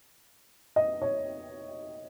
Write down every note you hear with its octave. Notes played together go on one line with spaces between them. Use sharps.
D#5
C#5